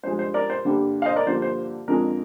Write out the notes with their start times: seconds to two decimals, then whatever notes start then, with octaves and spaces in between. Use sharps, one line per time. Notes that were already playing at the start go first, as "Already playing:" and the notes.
0.03 G2 F3 G#3 C5
0.19 C5
0.34 A#4 D5
0.50 C5
0.65 G2 D3 G3 A#3
1.02 F5
1.06 C5 D#5
1.16 A#4 D5
1.26 G2 D3 F3 A#3 C5
1.42 C5
1.88 F2 D3 F3 G#3 A#4